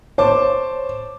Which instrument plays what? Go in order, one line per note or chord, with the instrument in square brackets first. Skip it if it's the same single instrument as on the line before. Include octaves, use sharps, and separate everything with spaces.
[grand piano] C5 A5 D6 [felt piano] C#5